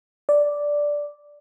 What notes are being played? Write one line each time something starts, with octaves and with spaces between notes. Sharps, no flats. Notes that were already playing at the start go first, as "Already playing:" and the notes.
D5